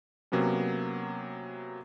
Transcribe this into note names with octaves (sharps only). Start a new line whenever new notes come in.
C3 F#3 A#3 B3 C#4